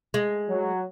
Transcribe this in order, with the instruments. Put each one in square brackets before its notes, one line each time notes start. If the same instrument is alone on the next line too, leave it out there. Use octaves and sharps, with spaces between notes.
[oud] G#3
[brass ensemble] F#3